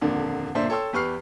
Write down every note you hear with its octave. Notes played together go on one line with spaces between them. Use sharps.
D#1 F2 D3 A#3 D4
G1 A#2 D4 C5 D5 E5
A4 C#5 G5 C6 E6
E2 G4 B4 C#6 F6 C7